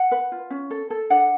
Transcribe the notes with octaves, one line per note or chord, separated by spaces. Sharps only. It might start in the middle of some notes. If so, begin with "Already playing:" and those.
Already playing: F#5
B4
F4
C#4
A4
A4
D4 F#5